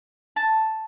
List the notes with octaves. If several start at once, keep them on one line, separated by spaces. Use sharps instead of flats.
A5